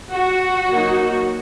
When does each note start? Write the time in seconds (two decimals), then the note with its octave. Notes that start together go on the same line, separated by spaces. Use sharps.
0.12 F#4
0.67 F#3 A#3 D#4